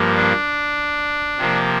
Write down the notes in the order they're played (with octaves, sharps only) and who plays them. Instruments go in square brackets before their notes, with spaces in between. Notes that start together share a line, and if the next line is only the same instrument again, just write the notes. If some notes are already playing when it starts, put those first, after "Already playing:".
Already playing: [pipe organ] G2 F3 A#3
D4
C3 F3 A#3